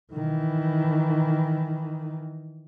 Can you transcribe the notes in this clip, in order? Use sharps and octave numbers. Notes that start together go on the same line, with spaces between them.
D#3 E3